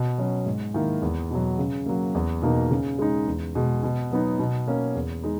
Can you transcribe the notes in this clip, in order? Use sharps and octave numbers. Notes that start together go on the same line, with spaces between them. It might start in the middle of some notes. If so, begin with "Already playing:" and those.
Already playing: B2
F#3 C#4
G#2
D#3 A#3 E4
E2
B2 F#3
C#3
F#3 A#3
E2
B2 A#3 D#4
C#3
G#3 D#4
E2
B2 G#3
B2
F#3 B3 D#4
B2
A#3 C#4
E2
G#3 D#4